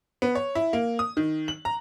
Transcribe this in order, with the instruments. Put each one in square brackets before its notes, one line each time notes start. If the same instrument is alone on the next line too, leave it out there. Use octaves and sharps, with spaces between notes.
[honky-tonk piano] B3
C#5
E4
A#3
D#6
D#3
F#7
A#5